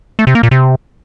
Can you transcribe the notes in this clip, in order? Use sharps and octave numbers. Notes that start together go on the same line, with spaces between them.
A3
C3
A#3
A#2
C3